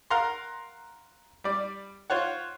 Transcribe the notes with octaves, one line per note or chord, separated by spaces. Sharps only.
A#4 F5 F#5 A#5 C6
G3 D5
F4 C5 C#5 F#5